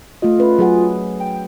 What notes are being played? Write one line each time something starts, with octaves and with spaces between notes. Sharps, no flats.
A3 F4 D#5
C#4 B4
F#3 G#4 F#5
G5